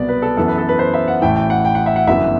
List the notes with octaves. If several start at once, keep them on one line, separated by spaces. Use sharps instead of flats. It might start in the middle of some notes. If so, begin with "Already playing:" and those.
Already playing: C2 B2 F#3 B3 D5
B4
A4
F#2 E3 B3 A4
B4
A4
B4
C5
E5
F#5
A1 A2 E3 A3 G5
G5
F#5
G5
F#5
E5
F#5
G1 F#2 E3 B3 E5